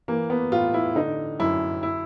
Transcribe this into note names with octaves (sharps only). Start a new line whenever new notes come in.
E3 A#3
B3
A2 F4
E4
D3 D#4
F#2 E4
E4